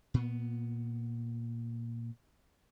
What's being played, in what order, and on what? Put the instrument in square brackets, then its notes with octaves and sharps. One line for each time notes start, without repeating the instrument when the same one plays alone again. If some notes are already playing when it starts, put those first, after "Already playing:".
[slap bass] A#2 B3